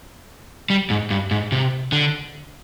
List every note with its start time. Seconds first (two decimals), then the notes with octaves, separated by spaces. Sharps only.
0.70 G3
0.90 G#2
1.10 G2
1.31 G#2
1.52 C3
1.92 D3